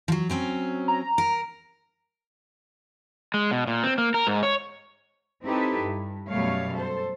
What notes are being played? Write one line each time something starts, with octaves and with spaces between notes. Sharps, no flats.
F3 F#3
F#3 C4 C#4
A#5
A#4
G#3
B2
A#2
C4
A#3
A#4
G#2
C#5
C4 D#4 E4 G4 A4 B4
G2
F#2 B2 G3 A3 C#5 F5
A4 C5